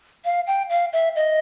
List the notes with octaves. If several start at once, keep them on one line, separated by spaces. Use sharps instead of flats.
F5
G5
F5
E5
D#5